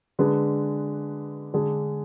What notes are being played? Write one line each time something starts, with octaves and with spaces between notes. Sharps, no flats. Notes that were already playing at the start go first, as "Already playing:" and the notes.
D3 G#3 D4 G#4 B4
D3 G#3 D4 G#4